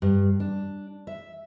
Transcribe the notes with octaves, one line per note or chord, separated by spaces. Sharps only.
G2
D4
E5